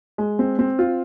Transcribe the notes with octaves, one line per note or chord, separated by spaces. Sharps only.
G#3
C4
C4
F4